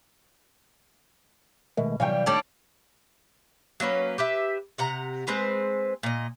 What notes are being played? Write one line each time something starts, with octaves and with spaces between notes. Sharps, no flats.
B2 D#3 G#3 A3
C3 E3 F#3 G3 C#5 F5 G5
D#3 G3 A3 C#4 D4
F#3 A#3 C#4 B4
G4 B4 E5
C3 F#5 A#5
G#3 C4 B4 C5
A#2 D#5